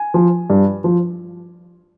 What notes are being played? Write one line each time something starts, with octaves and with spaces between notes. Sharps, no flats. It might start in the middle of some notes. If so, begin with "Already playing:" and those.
Already playing: G#5
F3
G2
F3